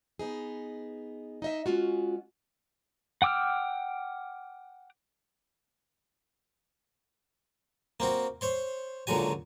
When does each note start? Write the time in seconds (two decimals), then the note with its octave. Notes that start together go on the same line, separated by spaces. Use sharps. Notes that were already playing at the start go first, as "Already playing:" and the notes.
0.19 B3 D#4 G#4
1.42 D#4 D#5 E5
1.66 G#3 C#4 F4 F#4
3.22 F#5 G5 D6 E6 F6
8.00 A#3 C4 F#4
8.41 C5 C#5 C6
9.07 C#2 A#2 D3 F#3 F#4 G#5